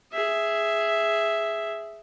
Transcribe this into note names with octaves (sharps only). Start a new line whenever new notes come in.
G#4 E5